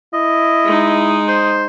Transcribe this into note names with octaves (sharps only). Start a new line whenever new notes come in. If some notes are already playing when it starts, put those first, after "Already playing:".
E4 D#5
G#3 D#4
C5